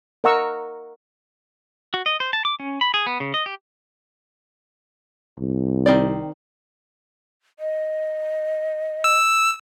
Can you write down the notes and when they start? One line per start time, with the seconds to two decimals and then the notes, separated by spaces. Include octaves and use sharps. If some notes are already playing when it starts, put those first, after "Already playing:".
0.24 A#4 D#5 F#5 A#5 C#6 E6
1.94 F#4
2.06 D#5
2.20 C5
2.33 A5
2.45 D6
2.60 C#4
2.81 B5
2.94 G#4
3.06 B3
3.20 C#3
3.34 D#5
3.46 G4
5.39 C2
5.86 D#3 C4 D5
7.59 D#5
9.04 E6